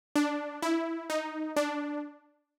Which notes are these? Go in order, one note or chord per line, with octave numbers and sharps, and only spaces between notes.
D4
E4
D#4
D4